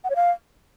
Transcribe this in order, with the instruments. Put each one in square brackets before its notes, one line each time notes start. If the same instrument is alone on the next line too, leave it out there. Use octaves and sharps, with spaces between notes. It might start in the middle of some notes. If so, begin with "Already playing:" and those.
[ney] F#5
C#5
F5